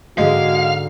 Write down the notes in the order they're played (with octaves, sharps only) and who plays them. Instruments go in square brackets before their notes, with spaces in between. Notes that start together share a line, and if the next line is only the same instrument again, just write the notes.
[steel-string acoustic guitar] G#2 D3 [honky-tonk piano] G#3 [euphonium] F#4 [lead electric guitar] F5